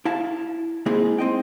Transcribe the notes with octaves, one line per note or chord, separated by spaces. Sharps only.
E4 F5 A5
G#3 A#3 C4 D#4 E4 G#4
C4 D#5 G5